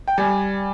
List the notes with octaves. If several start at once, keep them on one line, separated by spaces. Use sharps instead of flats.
G5
G3 G#5